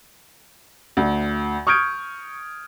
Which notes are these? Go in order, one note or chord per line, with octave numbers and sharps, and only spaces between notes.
D2
C#6 D#6 F6 G6 G#6 D7